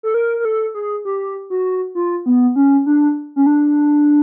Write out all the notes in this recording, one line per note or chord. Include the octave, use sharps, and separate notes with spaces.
A4
A#4
A#4
A4
G#4
G4
F#4
F4
B3
C#4
D4
C#4
D4